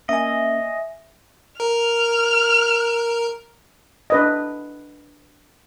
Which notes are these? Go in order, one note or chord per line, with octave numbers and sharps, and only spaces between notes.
A#3 C#4 D#5 E5 G#5
A#4 F6
D4 B4 D#5